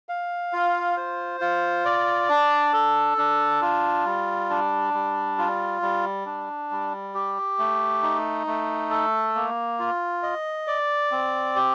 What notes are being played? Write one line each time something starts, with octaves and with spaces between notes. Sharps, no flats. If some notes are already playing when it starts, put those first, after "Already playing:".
F5
F4
C5
F4
D5
D4
A4
D4
F4
G3
D4
G3
F4
G3
D4
G3
G4
A3
D#4
A3
A4
A#3
F4
D#5
D5
C4
G4